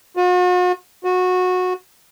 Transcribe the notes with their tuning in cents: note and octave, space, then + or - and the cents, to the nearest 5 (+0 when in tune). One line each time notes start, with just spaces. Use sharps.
F#4 -45
F#4 -20